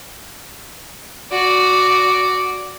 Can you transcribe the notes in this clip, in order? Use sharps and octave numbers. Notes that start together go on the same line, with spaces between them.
F#4 D5